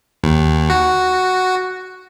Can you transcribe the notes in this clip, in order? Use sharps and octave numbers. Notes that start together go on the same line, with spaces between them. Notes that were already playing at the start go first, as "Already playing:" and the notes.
D#2
F#4